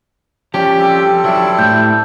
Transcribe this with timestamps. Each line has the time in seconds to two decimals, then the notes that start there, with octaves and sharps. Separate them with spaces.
0.54 F3 C#4 G4 D5
0.79 G3 C4 A4
1.24 F#3 D4 E4
1.59 A2 G6